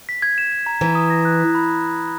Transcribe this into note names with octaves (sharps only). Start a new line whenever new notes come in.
B6
G#6
E7
E7
A#5
E3 A#5
D#6
A#6
F#6
B6
B5